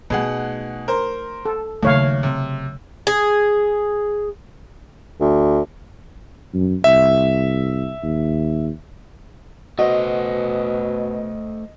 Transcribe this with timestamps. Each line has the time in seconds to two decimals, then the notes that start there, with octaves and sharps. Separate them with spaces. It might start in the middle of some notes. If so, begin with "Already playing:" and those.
0.10 B2 A3 D#4 G#4 F#5
0.88 A#4 C5
1.45 A4
1.83 D#2 C#3 F#3 A3 C#5 F5
2.23 C3
3.07 G#4
5.21 D2
6.54 F#2
6.84 C2 E5
8.03 D#2
9.79 B2 A3 F#4 C5 D#5